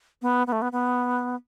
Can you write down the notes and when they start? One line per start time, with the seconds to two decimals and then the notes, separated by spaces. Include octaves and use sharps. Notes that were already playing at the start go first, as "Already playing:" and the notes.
0.22 B3
0.47 B3
0.52 A3
0.62 B3
0.72 B3